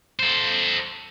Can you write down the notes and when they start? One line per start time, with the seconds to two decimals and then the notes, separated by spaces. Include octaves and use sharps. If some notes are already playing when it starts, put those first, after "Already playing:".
0.19 A4 C5